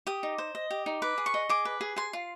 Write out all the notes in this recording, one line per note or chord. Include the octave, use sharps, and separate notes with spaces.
G4 D#6
D#4
C5
D#5
G4
D#4
B4 D6
G#4
C#6
D#5
G#4 D6
B4
G#4
G#4 C6
F4